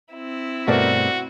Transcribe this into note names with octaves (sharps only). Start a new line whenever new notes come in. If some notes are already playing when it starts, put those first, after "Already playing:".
C4 E4
G2 B2 A3 F#4 A#4 C5 D5